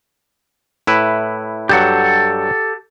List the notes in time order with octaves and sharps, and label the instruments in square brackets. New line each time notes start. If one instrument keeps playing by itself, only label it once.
[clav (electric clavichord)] A2 E4 B4
[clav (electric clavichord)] G2 F#3 [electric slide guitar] G4 A4 F#5